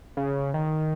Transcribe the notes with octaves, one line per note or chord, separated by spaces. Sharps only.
C#3
D#3